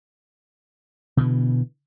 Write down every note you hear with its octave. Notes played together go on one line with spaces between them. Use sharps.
B2 D3 E3